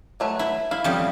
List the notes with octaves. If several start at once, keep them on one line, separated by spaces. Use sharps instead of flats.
F#3 A3 B4
E4
E4 F5
F2 C#3 G3